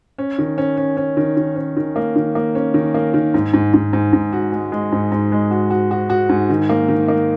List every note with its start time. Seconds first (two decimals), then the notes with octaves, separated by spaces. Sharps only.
0.18 C#4
0.39 D#3
0.58 C#4
0.77 C#4
0.97 C#4
1.17 D#3
1.37 D#3
1.56 C#4
1.77 D#3
1.96 A#3
2.16 D#3
2.35 A#3
2.55 C#4
2.74 D#3
2.94 A#3
3.14 D#3
3.34 G#2
3.54 G#2
3.74 G#2
3.93 G#2
4.13 G#2
4.33 F#4
4.52 G#3
4.72 G#3
4.92 G#2
5.12 G#2
5.32 G#3
5.51 F#4
5.70 F#4
5.91 F#4
6.10 F#4
6.29 G#2
6.50 D#3
6.69 A#3
6.89 D#3
7.08 A#3